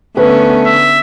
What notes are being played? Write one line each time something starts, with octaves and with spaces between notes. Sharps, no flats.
D3 A3 B3 C#4 B4
E5